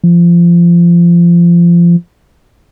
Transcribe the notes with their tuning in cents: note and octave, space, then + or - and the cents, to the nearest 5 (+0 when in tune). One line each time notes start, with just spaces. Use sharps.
F3 -25